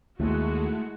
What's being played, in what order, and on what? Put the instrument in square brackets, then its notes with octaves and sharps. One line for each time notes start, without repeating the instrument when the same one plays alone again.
[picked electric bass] D#2 [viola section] G#3 F#4 [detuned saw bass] A3 [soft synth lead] E4